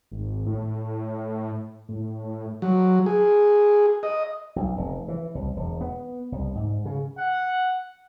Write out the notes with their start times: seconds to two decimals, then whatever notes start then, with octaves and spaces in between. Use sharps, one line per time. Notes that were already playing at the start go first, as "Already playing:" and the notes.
0.11 G#1
0.46 A2
1.89 A2
2.62 F#3
3.06 G#4
4.03 D#5
4.56 B1
4.77 F1
5.08 E3
5.35 C2
5.56 E1
5.81 B3
6.32 C2
6.55 G#2
6.85 C#3
7.19 F#5